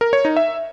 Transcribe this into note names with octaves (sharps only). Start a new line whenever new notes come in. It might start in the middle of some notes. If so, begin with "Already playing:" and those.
A#4
C#5
D#4
E5